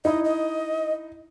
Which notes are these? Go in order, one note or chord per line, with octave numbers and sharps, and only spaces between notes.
D#4 E4 D#5
D#5